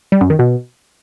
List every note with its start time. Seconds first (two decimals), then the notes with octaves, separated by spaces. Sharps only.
0.12 G3
0.21 F#2
0.30 D#3
0.39 B2